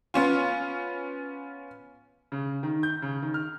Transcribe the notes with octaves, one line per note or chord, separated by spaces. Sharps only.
B3 C#4 F4
C#3
D#3
G6
C#3
D#3
F6